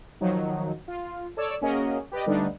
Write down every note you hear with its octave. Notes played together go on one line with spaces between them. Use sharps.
D#3 F3 F#3 D#4
F4
A4 C#5 D5 E6
A#3 C#4 F#4 G#4 A#4 D#5
G4 B4 D5 D#5
D3 G3 A3 B3 D4 D#4